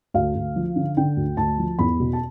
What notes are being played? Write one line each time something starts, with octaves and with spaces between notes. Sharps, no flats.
D2 F5
D2
F3
D3
D3 G5
D2
D2 A5
F3
E2 B5
B2
A5